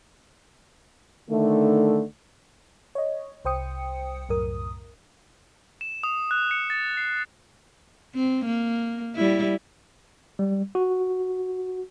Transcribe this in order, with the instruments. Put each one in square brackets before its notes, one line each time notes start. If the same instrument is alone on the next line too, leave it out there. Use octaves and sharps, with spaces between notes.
[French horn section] D3 D#3 A3
[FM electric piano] C#5 D#5
C2 C5 G5 D#6 C#7
C2 F#2 A2 A#4 D#6
[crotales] E7
D#6
F#6
C#7
A6
C7
[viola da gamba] C4
A#3
G3 E4
[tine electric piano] G3
F#4